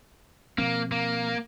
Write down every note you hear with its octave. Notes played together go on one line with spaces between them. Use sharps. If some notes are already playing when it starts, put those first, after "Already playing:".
B2 F3 A#3 C4
A#3